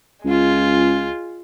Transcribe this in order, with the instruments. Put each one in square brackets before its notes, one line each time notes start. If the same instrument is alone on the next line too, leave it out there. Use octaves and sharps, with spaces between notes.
[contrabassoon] C#2 [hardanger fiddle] G#3 F4